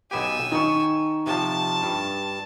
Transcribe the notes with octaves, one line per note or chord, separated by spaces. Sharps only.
B1 B3 G4 G#5 E6
D#3 D#4 C#6
C3 F3 A5
G2